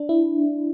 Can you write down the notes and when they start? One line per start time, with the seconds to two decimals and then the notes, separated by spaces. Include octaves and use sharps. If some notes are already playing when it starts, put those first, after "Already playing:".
Already playing: D4
0.09 E4